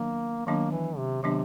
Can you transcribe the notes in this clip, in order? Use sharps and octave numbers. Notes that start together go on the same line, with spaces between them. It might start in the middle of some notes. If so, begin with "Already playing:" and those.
Already playing: D#3 F#3 A#3 B3 D4
D#3 F#3 A#3 B3 D4
E3
C3
C3 D#3 F#3 B3 D4